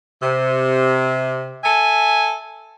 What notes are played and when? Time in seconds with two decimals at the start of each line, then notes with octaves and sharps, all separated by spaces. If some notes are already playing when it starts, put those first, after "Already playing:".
0.23 C3
1.64 A4 E5 G#5